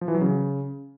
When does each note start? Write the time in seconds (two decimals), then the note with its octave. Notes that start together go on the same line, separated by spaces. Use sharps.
0.01 F3
0.08 E3
0.15 F#3
0.21 C#3